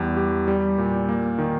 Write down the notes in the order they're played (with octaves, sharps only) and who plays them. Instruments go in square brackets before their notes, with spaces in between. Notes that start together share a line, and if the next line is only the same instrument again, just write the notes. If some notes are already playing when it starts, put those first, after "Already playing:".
Already playing: [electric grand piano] E2 G3
G4
G3
A#2
A#3
D#3